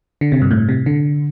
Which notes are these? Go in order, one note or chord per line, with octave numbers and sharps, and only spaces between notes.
D3
C3
G2
A2
C3
D3